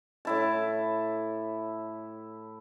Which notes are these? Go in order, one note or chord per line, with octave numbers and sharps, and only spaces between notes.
A2 E4 A5